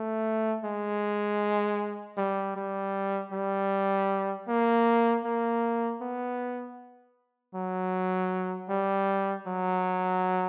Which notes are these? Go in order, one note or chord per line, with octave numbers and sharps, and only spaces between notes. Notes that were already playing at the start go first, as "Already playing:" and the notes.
Already playing: A3
G#3
G3
G3
G3
A#3
A#3
B3
F#3
G3
F#3